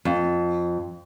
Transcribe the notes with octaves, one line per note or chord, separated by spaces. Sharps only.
F2